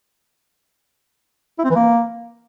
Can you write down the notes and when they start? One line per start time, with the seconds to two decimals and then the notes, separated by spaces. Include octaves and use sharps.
1.59 E4
1.64 C4
1.70 E3
1.75 A#3